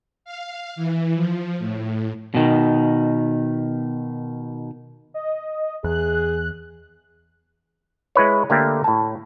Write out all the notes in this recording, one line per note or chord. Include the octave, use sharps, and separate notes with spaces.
F5
E3
F3
A2
B2 D#3
D#5
E2 G#4 F#6
G#3 E4 B4 C#5
D3 A3 A#3 G4
A2 A5